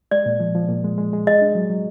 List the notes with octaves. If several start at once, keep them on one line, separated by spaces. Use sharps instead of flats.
G#3 D5
A#2
F3
F3
A#2
G#3
G#3
G#3
G#4 D#5
D4
F#3
F#3